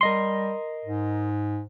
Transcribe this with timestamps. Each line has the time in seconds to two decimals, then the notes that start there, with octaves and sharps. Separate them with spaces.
0.01 G3 A#4 D#5 C6
0.85 G#2